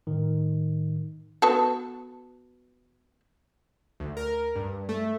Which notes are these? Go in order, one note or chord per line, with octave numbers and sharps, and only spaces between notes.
A2 D#3
B3 F#4 A4
D2
A#4
G2
A3